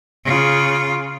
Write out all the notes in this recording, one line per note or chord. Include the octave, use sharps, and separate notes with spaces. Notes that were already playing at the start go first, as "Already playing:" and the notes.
C#3 F4